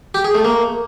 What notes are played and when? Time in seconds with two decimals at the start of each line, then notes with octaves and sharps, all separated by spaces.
0.15 G4
0.24 G#4
0.34 A3
0.44 A#3